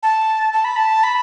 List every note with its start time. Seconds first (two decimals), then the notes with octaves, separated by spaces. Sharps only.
0.03 A5
0.53 A5
0.64 B5
0.76 A5
1.03 B5